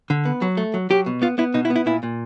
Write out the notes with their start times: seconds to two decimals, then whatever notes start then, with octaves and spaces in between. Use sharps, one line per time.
0.10 D3
0.25 B3
0.42 F#3
0.57 A3
0.74 F#3
0.90 F#3 G4
1.06 B2
1.22 B3 F4
1.38 B3 E4
1.54 B2 D#4
1.65 E4
1.70 B3
1.76 E4
1.86 A#2 E4
2.03 A#2